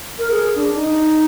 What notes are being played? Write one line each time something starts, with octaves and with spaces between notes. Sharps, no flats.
A#4
G#4
D4
D#4